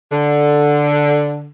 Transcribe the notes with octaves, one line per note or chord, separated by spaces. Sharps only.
D3